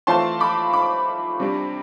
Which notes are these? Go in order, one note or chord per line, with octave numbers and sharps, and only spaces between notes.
E3 A3 C4 F4 A5 C6
B5 D6
B5 D6
C3 G3 D4